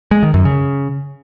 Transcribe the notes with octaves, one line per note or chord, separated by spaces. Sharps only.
G#3
D#3
F#2
C#3